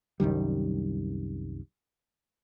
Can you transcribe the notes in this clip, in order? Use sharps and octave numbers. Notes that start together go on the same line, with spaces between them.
C2 F#2 D#3 G3